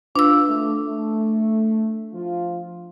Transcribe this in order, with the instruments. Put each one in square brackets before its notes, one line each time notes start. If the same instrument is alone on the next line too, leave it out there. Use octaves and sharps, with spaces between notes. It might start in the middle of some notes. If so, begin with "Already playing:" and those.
[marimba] D4 E6 [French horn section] F4 B4
[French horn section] A3
A3
F3 F4